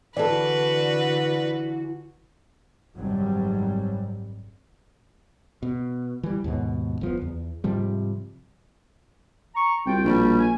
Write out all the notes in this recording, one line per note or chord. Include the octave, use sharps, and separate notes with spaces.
D3 E3 F#4 A4 B4 D5
G#1 F#2 C3 F#3 G3
B2
E3 G3
D#2 G#2 B2
F#1 F3 B3
E2
G#2 C3 F3 G3
A#5 C#6
C2 F4 F#4 G5
A#1 B2 G3
G#5